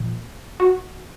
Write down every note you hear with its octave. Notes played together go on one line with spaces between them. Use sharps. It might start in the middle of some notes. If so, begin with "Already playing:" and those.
Already playing: A#2 F3
F#4